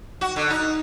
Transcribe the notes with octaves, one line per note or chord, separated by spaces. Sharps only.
F#4
D3
D#4